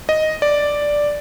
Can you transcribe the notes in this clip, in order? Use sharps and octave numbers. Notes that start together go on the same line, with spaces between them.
D#5
D5